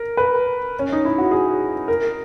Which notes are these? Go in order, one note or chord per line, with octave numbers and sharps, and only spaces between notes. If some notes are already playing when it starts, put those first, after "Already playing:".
Already playing: A#4
B4
C#4
D#4
E4
F#4
G#4
A#4